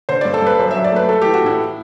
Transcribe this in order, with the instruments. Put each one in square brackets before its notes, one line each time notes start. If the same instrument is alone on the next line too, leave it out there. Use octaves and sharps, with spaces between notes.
[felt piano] D3 C5
G2 D5
A4
G2 B4
F#2 C5
F#3 E5
D5
A3 B4
A3 A4
E3 G4
F#4
A2 E4